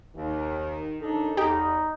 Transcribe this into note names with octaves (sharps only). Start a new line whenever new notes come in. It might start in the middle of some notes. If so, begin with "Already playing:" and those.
D#2 D#3
D#2 D#3 D4 D#4 A4
E2 D#4 G4